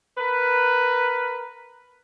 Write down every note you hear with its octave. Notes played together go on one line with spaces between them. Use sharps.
A#4 B4